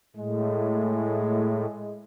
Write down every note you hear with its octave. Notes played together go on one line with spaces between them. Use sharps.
A2 G#3